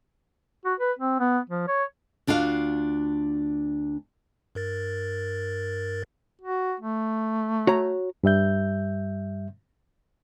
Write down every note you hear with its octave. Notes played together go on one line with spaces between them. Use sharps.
F#4
B4
C4
B3
F3
C#5
D2 D4 F4 F#4 F5
G2 A#4 A6
F#4
A3
F#4 C#5 A#5
G2 G3 E5 G6